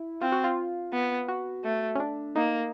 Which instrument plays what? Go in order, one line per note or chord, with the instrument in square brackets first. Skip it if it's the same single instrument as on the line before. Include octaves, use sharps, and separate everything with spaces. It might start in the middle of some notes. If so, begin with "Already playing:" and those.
Already playing: [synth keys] E4
[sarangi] C4 [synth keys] F4
[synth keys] F#4
F4
[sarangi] B3
[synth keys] F#4
[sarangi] A3
[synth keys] C#4
D4
[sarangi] A#3 [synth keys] D#4